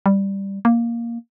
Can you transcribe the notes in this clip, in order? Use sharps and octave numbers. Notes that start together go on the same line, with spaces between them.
G3
A#3